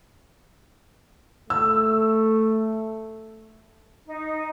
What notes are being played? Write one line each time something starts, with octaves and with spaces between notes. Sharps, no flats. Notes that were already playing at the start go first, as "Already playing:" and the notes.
A3 E6
D#4